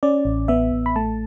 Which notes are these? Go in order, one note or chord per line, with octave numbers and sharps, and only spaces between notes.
C#4 D5
A1
B3 E5
A1
B5
A3 A5